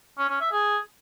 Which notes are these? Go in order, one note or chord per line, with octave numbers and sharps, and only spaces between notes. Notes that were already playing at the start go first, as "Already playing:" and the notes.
C#4
C#4
E5
G#4